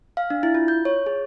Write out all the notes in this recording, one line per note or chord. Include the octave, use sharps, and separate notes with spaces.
F5
D4
E4
F4
G6
C#5
G#4